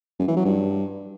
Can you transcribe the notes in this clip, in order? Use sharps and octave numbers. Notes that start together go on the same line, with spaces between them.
F#2
E3
F#3
G2